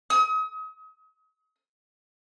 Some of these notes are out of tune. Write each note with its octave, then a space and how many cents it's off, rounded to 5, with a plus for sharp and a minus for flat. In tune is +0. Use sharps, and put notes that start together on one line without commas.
D#6 +40